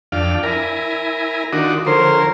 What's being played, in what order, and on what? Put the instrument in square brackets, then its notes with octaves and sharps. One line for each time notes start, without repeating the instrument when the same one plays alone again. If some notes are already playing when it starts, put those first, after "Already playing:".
[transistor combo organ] F2 F5 [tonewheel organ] D4 D5 G5
[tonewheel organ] E4 E5 G#5 [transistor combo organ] A#4
[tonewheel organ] D#3 F4 [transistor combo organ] D4 D#4 F#4
[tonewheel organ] D3 F3 C#5 [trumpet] A#4 [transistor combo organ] C5